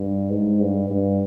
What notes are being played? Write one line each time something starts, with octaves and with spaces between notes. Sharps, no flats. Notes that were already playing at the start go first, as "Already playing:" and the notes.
Already playing: G2
G#2
G2
G2